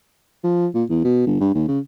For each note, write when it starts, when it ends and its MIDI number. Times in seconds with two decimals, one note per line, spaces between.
0.43 0.67 53
0.74 0.84 46
0.89 1.01 40
1.04 1.23 47
1.26 1.36 31
1.40 1.53 43
1.55 1.65 39
1.68 1.79 49